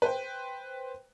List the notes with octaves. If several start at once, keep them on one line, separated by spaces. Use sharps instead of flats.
B4 C5 G5